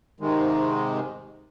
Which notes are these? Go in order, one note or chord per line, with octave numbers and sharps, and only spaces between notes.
G#2 C3 D#3 G#3